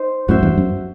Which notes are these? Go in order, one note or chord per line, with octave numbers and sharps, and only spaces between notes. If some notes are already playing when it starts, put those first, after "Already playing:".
Already playing: D#4 C5
F#2 A2 F#4 C5 E5
E2 G2
F#2